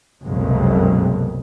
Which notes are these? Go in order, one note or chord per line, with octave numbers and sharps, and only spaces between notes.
F#1 C2 F2 B2 G#3